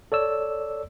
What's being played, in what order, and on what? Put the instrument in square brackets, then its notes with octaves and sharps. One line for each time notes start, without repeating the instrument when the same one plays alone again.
[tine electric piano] A4 C#5 D5 E6